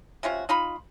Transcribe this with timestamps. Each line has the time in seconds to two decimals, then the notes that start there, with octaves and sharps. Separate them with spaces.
0.23 C3 C#4 F4 F#4
0.49 D#4 F4 B5